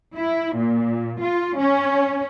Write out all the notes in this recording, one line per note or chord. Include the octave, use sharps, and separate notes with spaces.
E4
A#2
F4
C#4